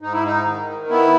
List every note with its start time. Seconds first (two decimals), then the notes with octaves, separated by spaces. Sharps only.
0.01 G#2 D#4
0.13 E4
0.24 D#4
0.46 D#3
0.89 B3 E4